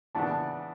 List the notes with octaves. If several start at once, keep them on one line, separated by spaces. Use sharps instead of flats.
C#3 E3 B3 D4 A5